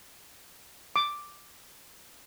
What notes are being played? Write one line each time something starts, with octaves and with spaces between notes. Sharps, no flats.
D6